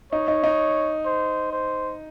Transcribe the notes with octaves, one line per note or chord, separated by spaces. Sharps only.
D#4 C#5
D#4
D#4
C5
C5